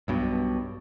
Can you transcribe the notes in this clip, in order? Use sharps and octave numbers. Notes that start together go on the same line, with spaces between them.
B1 G2 B2